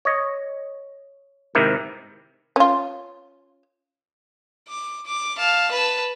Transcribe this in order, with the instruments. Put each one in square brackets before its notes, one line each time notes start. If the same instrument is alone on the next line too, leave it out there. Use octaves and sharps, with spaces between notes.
[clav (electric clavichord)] C#5 D#5
G#2 C3 D#3 E4 G4 A#4
[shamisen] C#4 F4
[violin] D6
D6
F5 A5
B4 A5